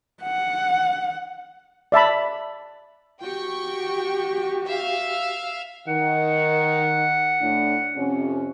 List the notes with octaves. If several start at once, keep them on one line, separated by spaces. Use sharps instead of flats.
F#5
D5 E5 A5 B5
F#4 G4 G5 C#6
E5 F5
D#3 F#5
A2 D4
F2 C3 C#4